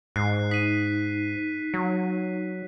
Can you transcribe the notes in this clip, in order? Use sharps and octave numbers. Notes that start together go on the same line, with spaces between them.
G#2 F#6 C7
D#4 B6 D#7
F#3